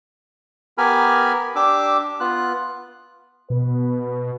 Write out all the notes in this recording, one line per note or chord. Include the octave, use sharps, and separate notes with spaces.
B3 G4 A#4 G#5 B5 F6
D4 G4 D6 E6
B3 F4 F#6
B2 B4